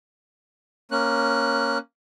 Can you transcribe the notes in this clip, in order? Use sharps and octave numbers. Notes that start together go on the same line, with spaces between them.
A#3 C#4 F#6